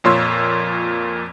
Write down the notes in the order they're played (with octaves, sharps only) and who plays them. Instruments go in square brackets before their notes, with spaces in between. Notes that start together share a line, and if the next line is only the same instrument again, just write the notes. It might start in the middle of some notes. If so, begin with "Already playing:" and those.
[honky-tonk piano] F2 A#2 F4 C#5 C6 E6